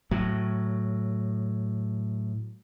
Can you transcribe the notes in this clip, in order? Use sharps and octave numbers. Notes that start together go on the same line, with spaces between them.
A2 F#3